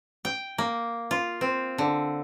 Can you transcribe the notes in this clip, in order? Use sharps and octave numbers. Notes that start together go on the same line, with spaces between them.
G5
A#3
F4
C4
D3